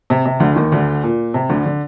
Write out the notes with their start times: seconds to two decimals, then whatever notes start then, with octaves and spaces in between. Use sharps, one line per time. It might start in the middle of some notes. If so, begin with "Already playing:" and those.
0.10 C3
0.26 C3
0.40 D2 D3
0.56 D#2 D#3
0.72 D2 D3
1.04 A#2
1.34 C3
1.49 D2 D3
1.66 D3